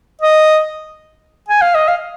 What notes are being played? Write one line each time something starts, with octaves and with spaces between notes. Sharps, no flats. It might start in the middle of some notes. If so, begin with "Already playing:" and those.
D#5
G#5
F5
D#5
F5